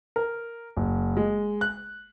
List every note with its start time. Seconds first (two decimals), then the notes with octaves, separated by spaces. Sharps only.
0.16 A#4
0.77 F#1
1.17 G#3
1.61 F#6